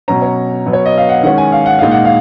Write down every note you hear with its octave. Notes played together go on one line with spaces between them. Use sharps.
B2 F#3 C#4 A#5
C#5
B2 F#3 B3
C#5
D#5
F5
F#5
D#3 G#3 C#4 F#5
G#5
F5
F#5
A#2 G#3 D#4 F5
F#5
F5